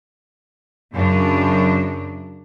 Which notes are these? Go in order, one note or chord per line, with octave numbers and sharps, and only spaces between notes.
F#2 C#3 D4